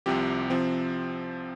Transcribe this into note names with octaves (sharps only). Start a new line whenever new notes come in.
C2 C3 F3 C4 G4
C3 F3 C4